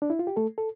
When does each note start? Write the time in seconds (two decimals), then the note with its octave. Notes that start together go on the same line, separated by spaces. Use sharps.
0.02 D4
0.10 E4
0.19 F4
0.27 G4
0.36 A3 A4
0.58 A4